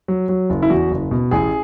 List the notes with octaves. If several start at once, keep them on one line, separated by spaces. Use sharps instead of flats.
F#3
F#3
F#1
E4
E2 F#4
F#1
B2
A1 G#4